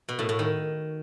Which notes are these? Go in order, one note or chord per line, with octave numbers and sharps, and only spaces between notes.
B2
A2
A2
D#3